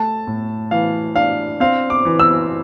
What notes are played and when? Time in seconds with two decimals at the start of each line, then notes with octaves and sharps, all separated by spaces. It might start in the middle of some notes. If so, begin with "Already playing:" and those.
Already playing: A3 A5
0.27 A2
0.71 E3 F5
1.16 D4 F5
1.60 C4 F5
1.90 D6
2.05 E3
2.19 E6